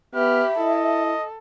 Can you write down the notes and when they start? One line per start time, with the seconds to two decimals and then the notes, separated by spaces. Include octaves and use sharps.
0.15 B3 G4 E5 B5 F6
0.58 E4 A4 D#5